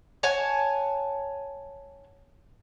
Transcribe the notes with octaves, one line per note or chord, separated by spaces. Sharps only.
C#5 F#5 G#5 A5